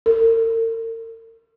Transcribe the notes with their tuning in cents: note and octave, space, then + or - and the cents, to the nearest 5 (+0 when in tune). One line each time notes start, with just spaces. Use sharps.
A#4 -45